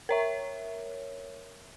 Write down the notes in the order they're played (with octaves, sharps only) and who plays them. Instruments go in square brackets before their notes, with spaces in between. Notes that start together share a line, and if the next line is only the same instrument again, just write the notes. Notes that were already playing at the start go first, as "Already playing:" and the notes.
[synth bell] A#4 C#5 E5